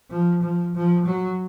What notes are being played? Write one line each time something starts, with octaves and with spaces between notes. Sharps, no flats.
F3
F3
F3
F#3